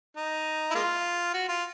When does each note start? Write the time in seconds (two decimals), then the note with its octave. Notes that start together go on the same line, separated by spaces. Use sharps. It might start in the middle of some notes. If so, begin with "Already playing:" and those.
0.16 D#4
0.71 E4
0.75 G#3 A#3 F4
1.34 F#4
1.49 F4